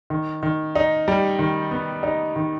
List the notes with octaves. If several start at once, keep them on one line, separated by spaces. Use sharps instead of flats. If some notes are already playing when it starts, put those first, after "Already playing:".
D#3
D#3
D#4
G3
D#3
B3
D#4
D#3